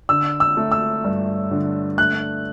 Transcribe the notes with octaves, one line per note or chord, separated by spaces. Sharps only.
D3 E6
E6
A3
E6
G2
D3
A3 F#6